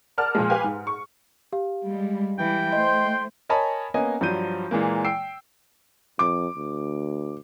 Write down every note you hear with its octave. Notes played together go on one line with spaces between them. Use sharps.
A#4 D5 F#5 A5 F6
A#2 F3 G#3
G4 B4 F5 G5 G#5
G#2
C#6
G4 F5
G3 G#3
E3 G3 G5
A3 C5 D#5 C6
A#4 C#5 D#5 G#5 A5 B5
A#3 B3 C#4 D#5 G#5
G2 F3 F#3 G6 D#7
A#2 E3 G#3 A#3
G5 E6 C7 D7
F2 D6
D2